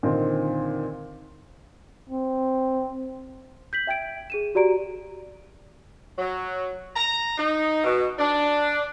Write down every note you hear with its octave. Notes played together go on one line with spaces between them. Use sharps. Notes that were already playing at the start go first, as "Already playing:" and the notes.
A#2 D3 D#3 C4
C4
G6 B6 F#7
E5 G5 G#6 D7
G#4 D#7 E7
F#4 G4 D5 A#5 D7
F#3
A#5
D#4
B2
D4